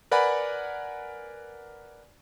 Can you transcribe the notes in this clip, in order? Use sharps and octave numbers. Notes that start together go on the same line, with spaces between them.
A#4 B4 D5 F#5 G#5 B5